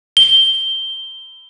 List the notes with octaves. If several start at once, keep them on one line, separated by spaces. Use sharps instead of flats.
G7